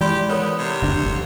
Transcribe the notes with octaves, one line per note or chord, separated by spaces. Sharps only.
E3 G#3 G4 D5 B5 C6
B3 A4 A#4 C#5
C3
F#1 D2 D4
F1